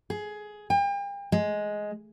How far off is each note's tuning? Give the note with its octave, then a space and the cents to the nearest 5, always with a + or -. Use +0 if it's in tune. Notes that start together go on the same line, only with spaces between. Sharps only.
G#4 +15
G5 +40
G#3 +5